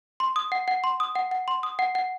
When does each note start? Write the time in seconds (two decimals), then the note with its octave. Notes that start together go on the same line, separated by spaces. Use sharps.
0.20 C6
0.36 D#6
0.52 F#5
0.68 F#5
0.84 C6
1.00 D#6
1.15 F#5
1.31 F#5
1.48 C6
1.63 D#6
1.79 F#5
1.95 F#5